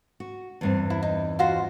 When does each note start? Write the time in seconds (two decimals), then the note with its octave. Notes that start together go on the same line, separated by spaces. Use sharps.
0.20 F#4
0.61 E2 G2 C4
0.90 E4
1.03 D#4
1.39 F4 F#4 C5